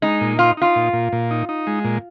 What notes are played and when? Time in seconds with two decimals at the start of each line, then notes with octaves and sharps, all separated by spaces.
0.02 G#3 D#4
0.21 A#2
0.39 D#4 F4
0.57 D#4 F4
0.76 A#2
0.93 A#2
1.12 A#2
1.31 D#4
1.49 D#4
1.67 G#3
1.85 A#2